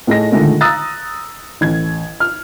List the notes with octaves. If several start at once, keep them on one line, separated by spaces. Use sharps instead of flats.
A2 A3 G#4 D#5 A#6
A#2 D3 D#3 G#3 A3
A#5 D#6 E6 F#6 A6 A#6
A1 G#6
F6